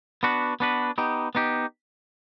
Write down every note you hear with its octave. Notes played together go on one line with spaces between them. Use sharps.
B3 D4 F#4 B4
B3 D4 F#4 B4
B3 D#4 G4
B3 D#4 G4